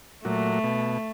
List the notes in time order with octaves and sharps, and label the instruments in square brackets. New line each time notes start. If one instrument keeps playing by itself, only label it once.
[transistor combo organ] A#2 F#3 [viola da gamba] A3
[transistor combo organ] B2